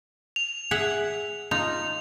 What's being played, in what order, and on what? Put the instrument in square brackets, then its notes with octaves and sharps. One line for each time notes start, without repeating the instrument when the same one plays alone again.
[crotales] F7
[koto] G#4 E5 F#5
[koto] D#4 F4 [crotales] F7